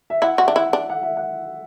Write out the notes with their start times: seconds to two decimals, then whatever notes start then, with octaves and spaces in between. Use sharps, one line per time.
0.10 E5
0.22 E4 F#5
0.38 F#4
0.43 D4 E5
0.55 E4 F#5
0.73 D4
0.90 F#5
1.03 E5
1.17 F#5